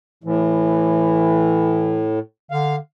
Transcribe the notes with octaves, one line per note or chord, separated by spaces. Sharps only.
A2 E3
D3 F5